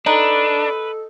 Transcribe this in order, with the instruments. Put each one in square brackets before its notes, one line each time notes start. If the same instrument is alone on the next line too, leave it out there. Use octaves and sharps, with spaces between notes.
[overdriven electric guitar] D4 [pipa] D#4 [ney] A4 [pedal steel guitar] B4